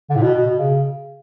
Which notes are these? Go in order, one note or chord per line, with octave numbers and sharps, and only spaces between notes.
D3
A2
B2
B2
B2
C#3